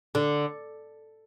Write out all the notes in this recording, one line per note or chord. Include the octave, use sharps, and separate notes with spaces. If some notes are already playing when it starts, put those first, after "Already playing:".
D3